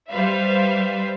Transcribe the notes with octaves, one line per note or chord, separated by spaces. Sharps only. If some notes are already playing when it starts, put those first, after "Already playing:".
G3 B4 C5 E5 F5